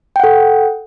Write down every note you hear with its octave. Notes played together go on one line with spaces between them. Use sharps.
A4 F#5 G5